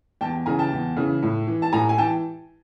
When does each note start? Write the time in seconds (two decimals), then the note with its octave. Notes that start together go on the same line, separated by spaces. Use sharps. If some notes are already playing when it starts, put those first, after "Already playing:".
0.21 E2 G5 A5
0.46 C#3 E3 G#5 A#5
0.59 G5 A5
0.72 E2
0.96 C#3 E3
1.22 A2
1.47 E3
1.62 A5
1.72 A2 G#5 A#5
1.89 G#5
1.98 E3 G5 A5